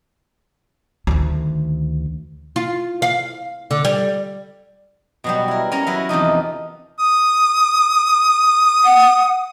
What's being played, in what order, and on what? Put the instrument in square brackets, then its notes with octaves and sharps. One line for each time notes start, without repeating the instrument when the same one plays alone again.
[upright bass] D2 D#3
[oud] F4
F5
D3
G3
[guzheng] B2 F#3 G3
E4 A#4
C#4 A#4 C#5 A#5
F#3 E4 A#4 B4
E2 C3 F3 D#4
[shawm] D#6
[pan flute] F#5